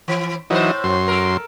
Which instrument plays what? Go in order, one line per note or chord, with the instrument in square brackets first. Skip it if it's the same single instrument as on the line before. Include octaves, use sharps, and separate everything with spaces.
[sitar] E3
[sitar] A2 A#4 C5 [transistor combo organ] E3 F#3 D#4
[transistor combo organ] F#2 C6
[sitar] A4 A#4